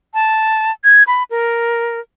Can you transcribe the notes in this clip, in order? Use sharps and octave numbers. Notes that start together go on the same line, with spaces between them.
A5
G#6
B5
A#4